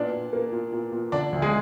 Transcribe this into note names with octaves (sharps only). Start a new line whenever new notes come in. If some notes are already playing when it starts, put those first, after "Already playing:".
Already playing: A#2 B3 D4 D5
A#2
A#3
A#2
A#2
A#2
D3 D4 D5
D2
G#3 G#4